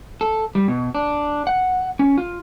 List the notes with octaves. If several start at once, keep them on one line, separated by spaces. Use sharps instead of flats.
A4
G3
B2
D4
F#5
C#4
F4